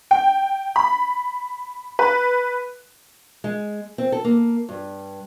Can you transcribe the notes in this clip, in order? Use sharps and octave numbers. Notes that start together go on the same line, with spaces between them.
G5
B5
B4
G#3
C4
A4
A#3
G2